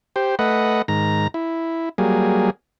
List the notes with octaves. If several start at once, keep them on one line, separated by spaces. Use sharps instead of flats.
G4 C5
A3 B4 D#5 F#5
G#2 D#3 A#5
E4
F#3 G3 A#3 G#4